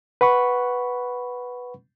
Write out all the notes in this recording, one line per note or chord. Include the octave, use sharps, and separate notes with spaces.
B4 F#5 B5 C#6